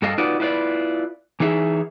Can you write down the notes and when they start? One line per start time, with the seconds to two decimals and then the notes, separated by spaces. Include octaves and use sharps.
0.02 G2 A4 D#5 F5
0.18 D#4 F4 F#4 B4 D5
0.40 E4 F4 B4 C5 D5
1.40 E3 D#4 G#4 E5